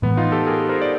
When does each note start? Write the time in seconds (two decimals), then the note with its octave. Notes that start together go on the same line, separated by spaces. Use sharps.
0.02 A2 E3 G#3 B3
0.17 D#4 F4
0.32 G4 A4
0.47 G#4 A#4
0.69 A#4 C5
0.81 D5